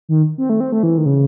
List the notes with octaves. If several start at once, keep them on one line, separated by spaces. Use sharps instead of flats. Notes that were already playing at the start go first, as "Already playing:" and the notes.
D#3
C4
A3
C4
A3
E3
D#3
C#3